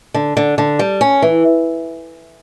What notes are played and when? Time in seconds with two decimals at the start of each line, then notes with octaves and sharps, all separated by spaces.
0.14 D3
0.37 D3
0.58 D3
0.79 G3
1.01 C#4
1.22 E3